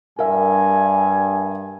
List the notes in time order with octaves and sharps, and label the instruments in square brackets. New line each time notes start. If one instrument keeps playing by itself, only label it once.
[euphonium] G2 [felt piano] A#4 E5 [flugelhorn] G#5